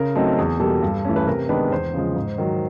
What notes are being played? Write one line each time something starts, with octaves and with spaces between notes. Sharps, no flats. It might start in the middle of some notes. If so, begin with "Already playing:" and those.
Already playing: C#3 A#4
F#3 A3 C4 D#4 A4
E2 G#4
B2 G3 A#3 A4
G2
E3 A3 C#4
B4
C3 A#4
D#3 G#3 B3 D4 B4
E2 C5
C#3 F3 G#3
G#2
D#3 F#3